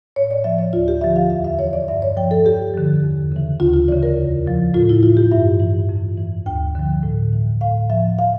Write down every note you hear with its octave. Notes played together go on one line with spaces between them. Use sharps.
A2 C#5
D5
F3 E5
D5
D2 F4
G4
D3 F3 E5
F5
E2 E5
E5
E3 C#5
D5
G2 E5
C#5
F3 G5
A4
F2 G4
D3 F3
E2
C#3 E3
D2 F4
F4
C#3 E3 D5
A#4
E2
C#3 F3
A2 F4
E4
E3 F4
G4
G2 E5
E3
F2
E3
D2 G5
D3 F3
A2
E3
A2 F5
F3 E5
F5